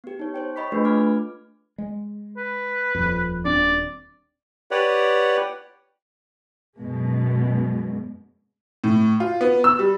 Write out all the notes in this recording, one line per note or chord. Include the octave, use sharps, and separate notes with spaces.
B3 G4
D#4 C#5
C5 C#5 G5
C#5 D#5 B5 C#6 B6
A3 D4 F4 G#4 B4
D6 F6 G#6
G#3
B4
D#1 F2
D#1 C4 D4 D5
G4 B4 C#5 D5 F#5
F#2 B2 G#3
A2
F4
B3
E6
G3